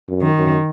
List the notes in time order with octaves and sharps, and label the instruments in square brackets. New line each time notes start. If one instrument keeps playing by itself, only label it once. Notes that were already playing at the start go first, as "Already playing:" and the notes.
[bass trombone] F#2
[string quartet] D#3
[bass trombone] F#2